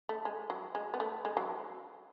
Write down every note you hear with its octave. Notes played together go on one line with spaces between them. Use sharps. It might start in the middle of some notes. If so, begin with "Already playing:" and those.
A3
G#3
F#3
G#3
B3
A3
G#3
F#3